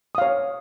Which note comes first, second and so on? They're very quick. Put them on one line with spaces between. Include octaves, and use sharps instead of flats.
D#6 F5 C#5